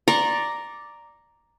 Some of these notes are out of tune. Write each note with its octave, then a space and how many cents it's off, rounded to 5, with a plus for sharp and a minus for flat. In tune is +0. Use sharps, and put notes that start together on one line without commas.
D5 +0 A#5 +0 C#6 -40